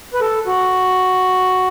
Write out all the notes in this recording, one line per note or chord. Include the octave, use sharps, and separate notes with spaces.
B4
A4
F#4